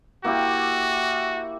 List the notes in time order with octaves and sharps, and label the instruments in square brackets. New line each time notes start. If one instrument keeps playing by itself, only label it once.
[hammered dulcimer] A#3 E4 G4 [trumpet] F#4